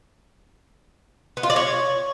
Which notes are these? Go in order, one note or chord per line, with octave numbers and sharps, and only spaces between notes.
B3
F4
D5
C#5